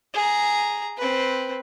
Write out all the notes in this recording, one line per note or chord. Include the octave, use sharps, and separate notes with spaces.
G#4 A#5
C4 B4